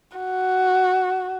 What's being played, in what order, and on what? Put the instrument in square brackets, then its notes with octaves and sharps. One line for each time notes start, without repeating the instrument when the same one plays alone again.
[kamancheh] F#4